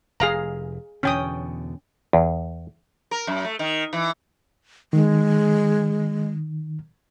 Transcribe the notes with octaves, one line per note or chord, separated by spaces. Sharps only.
F1 G#4 F5 A#5
E2 B2 D3 C#4 G5 D#6
E2
A#4
F#2
A3
D#3
E3
D#3 G#3